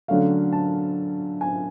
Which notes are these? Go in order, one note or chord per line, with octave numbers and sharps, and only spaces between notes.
D3 F#3 A3 C#4 F5
A5
G#5